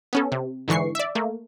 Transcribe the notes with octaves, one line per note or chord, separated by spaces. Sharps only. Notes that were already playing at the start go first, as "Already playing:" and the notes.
B3 C#4 A4
C3
G#2 D3 E3 C#6 C7
D5 E5
A3 A#3